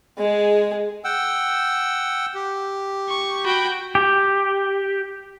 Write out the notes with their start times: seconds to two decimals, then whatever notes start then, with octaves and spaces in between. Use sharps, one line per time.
0.18 G#3 G#4
1.05 F#5 G5 E6
2.35 G4
3.09 C#6
3.45 F#4 G5 B5
3.95 G4